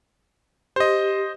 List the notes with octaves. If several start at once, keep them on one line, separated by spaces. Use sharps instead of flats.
G4 C5 D#5